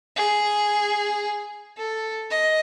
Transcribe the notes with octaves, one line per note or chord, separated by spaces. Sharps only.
G#4
A4
D#5